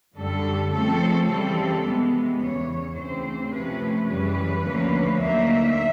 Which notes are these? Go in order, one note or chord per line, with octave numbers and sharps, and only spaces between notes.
F#2 D3 G3 A4
C#3 F3 A3 C4 A4
C#3 E3 G3 C4 A4
C3 E3 G#3 B3
E2 C#3 E3 C#5
D2 C#3 E3 A3 C4 C5
C3 F3 A3 C#4 B4
F#2 C#3 E3 G3 B4
D2 D3 F3 A#3 C#4
D2 D3 F#3 A#3 D#4 E5